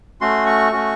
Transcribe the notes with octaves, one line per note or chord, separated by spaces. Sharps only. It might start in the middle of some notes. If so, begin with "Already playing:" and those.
A3 C#4 F#4 C6
C#6
A3 C#4 F#4